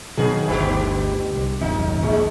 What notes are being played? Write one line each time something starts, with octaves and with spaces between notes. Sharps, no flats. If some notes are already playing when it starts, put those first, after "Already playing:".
B2 D#3 F#3 G#4
G1 D2 D3 B3 G4
C2
D#1 G#1 F#2 D#4
A#1 D#2 G#3